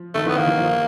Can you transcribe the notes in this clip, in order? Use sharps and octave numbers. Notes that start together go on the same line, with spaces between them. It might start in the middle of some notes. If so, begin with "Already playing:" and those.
Already playing: F3
D#3 A3
E3 B3
D#3 A#3
E3
F3